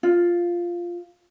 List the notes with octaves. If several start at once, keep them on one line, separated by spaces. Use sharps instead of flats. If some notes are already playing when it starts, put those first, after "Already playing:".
F4